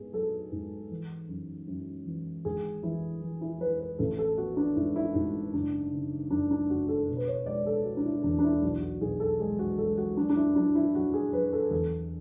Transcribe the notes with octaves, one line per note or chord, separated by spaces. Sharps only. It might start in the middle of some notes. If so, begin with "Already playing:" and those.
Already playing: G#2 B3 G#4
F#3 A4
G#2
E3
F#2
F#2
E3
G#1 G#4
E3 E4
E3
E4
E3 B4
B4
A1 A4
A4
B3 F#4
D4
G#2 E4
E4
G#2 F#4
F#1 D4
C#3
F#1 D4
D4
F#1 F#4
A4
B2
B4
C#5
G#3 D5
A4
G#3 F#4
D4
E4
E2 D4
D4
E4
B1 F#4
F#4
B1 G#4
A4
G#3 G#4
F#4
G#3 A4
F#4
F#3 D4
D4
E4
F#3 D4
E4
F#3 F#4
G#4
F#3 B4
A4
E2 A4